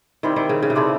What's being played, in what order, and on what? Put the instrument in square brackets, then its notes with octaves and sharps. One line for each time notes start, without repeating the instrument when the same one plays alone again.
[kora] D#3 [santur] G3 C4 E4
[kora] D#3
C#3
C#3
C3
[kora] C#3 [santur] C4 E4 A4 D5